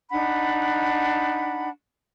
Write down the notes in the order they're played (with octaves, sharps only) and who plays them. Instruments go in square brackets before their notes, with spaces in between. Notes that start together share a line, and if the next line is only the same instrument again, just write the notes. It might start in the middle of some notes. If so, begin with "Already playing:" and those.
[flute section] D4 D#4 F#5 B5